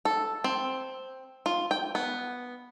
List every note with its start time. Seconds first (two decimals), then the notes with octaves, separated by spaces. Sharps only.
0.05 A4
0.44 C4
1.46 F4
1.71 G5
1.95 B3